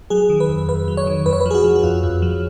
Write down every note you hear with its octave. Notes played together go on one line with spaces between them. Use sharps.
F#3 G#4
D#3
B4
F2
F2 B4
F#3
C#5
D#3
F2 B4
C#5
F3 B4
G#4
F#4
F3
F#4
F2 F4
F2
F3